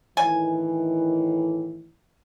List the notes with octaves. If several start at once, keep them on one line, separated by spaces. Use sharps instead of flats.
A2 D#3 E3 G#5